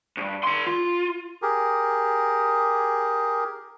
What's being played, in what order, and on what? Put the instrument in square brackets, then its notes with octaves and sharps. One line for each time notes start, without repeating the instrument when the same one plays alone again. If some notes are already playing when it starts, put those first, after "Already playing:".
[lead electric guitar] D2 G2
D#3 C6
F4
[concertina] G4 G#4 A#4